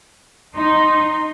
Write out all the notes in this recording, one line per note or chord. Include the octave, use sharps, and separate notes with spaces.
D#4 C6